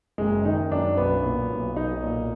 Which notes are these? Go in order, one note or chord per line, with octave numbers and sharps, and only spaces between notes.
F#1 G#3
D#3 D#4
F#2 D4
B1 B3
A#2
B1
B1 D#4
A#2